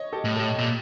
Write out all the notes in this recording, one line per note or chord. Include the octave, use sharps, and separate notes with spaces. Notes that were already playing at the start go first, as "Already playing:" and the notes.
Already playing: C#5 D#5
G4 A4
A2
G4 A4
A#2 G4